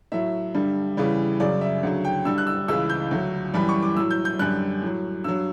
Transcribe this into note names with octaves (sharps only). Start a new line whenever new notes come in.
A2 F#3 E5
G2 D3 G3
E2 C#3 E3 G3
F#2 C#3 F#3 D5
E5
D2 C#3 F#3
G5
G2 D3 G3 E6
F#6
E6
C#2 C#3 E3 E6
G6
D2 D3 F#3
F#2 E3 G3 B5
C#6
D6
A2 F#3 E6
G6
G6
F#2 D3 G3 F#6
A2 F#3
G2 F#3 E6